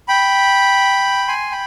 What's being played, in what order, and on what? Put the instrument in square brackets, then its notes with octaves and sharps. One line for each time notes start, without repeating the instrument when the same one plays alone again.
[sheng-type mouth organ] G5 B5
G#5 C6
G5 B5